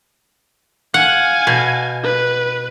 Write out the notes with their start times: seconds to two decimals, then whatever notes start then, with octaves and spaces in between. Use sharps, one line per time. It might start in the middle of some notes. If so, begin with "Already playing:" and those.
0.94 F5 F#5 G#5
1.47 B2
2.03 B4